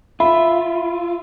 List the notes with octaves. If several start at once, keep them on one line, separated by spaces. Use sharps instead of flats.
F4 E5 B5